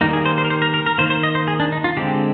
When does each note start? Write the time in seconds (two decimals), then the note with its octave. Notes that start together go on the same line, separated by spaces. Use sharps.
0.01 D#3 G3 A#3 D#4
0.13 G#4
0.25 C5
0.38 C5
0.45 A#4
0.50 C5
0.62 A#4
0.74 A#4
0.86 A#4
0.98 D#3 A#3 C5
1.10 C5
1.23 D#5
1.35 C5
1.48 G#4
1.60 D4
1.72 D#4
1.84 F4
1.97 D3 G#3 C4 G4